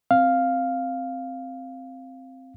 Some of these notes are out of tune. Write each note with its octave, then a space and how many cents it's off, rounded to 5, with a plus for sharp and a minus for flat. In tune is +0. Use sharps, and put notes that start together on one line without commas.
C4 +0 F5 +0